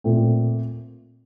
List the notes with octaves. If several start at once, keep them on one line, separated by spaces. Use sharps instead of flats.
A#2 A3 C4